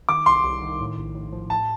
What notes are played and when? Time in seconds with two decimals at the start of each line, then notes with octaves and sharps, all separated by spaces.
0.09 D#3 D6
0.26 C2 C6
0.44 C2
0.62 D#3
0.80 A2
0.97 A#1
1.15 A2
1.33 F3
1.50 A2 A5